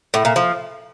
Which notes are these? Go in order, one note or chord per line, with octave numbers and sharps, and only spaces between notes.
A2
A#2
F3